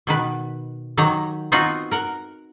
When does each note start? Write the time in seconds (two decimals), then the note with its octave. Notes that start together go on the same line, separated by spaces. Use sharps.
0.07 B2 D#3 B4
0.97 D#3 F#3 G4 A#5
1.52 B3 C4 D#4 F4 F#4
1.91 A#4 F#5